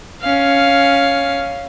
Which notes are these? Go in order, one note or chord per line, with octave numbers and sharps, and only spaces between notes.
C#4 F5